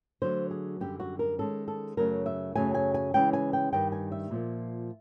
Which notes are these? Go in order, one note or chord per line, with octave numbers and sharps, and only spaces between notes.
D3 F#3 A3 C5
G#4
F#2 D3 G3 G4
F#4
A#4
D#3 G#3 C#4 A4
A4
F#2 C#3 F#3 A3 A#4
E5
F#2 C#3 F#3 A3 G#5
G#5
G#5
C#3 E3 G#3 C#4 G5
G#5
G5
G2 D#3 G3 G5
G#5
E5
A#2 F3 A#3